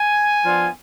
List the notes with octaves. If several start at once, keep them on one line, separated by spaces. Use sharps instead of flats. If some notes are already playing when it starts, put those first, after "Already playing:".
Already playing: G#5
F3 B3 D4 F4